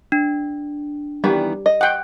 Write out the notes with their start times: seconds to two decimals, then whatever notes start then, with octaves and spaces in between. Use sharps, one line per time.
0.12 D4
1.24 D#3 E3 G3 B3
1.66 D#5
1.81 F#5 G5